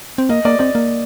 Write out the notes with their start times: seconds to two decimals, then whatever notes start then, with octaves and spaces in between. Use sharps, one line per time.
0.18 C4
0.29 A#3 D#5
0.45 A#3 D5
0.59 C4 D5
0.75 A#3